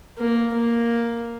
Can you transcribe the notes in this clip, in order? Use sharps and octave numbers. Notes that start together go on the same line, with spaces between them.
A#3
A#3